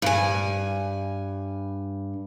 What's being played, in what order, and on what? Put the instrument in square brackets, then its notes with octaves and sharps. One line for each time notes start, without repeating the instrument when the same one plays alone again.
[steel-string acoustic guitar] G2 G#5